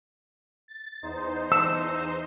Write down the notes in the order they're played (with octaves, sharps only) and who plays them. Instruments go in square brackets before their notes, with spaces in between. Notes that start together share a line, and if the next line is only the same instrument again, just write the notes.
[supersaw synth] A6
E2 D#4 C5
[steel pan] E6